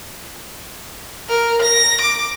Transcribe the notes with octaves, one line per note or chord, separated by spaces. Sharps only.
A#4
A#6
D6